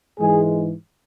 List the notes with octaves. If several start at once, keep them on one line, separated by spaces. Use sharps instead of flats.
G#2 E3 G#3 G#4